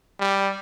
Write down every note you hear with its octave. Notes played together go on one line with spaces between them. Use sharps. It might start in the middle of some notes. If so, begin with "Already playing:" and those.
G3